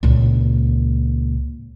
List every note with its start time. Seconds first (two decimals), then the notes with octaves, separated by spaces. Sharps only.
0.03 C#2 A#2